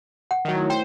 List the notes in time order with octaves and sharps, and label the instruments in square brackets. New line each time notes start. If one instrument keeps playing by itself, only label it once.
[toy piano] F#5
[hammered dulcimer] A2 A3 [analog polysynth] D#3 F#3
[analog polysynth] C5 [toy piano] G5